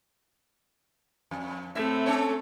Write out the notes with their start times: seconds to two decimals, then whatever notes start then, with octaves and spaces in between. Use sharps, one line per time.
1.31 F2
1.75 A2 A3 C4 E5
2.06 C#4 A4 C#5